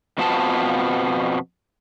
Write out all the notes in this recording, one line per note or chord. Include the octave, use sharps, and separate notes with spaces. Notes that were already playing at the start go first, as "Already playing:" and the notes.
F2 B2 F3 B3 A5